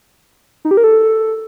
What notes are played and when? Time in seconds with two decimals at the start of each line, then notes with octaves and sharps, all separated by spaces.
0.65 D#4
0.71 G4
0.77 A#4
0.84 A4